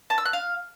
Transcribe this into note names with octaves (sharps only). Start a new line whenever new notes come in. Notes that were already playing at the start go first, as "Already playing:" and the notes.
A5
E6
F#6
F5